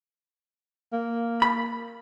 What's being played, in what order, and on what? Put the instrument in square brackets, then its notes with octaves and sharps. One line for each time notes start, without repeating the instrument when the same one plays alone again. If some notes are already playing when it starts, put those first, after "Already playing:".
[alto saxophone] A#3
[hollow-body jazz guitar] B5